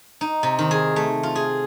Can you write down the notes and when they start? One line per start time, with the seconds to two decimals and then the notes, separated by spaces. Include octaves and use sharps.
0.21 D#4
0.43 C3
0.59 D#3
0.71 G#4
0.96 A3
1.23 F4
1.35 G#4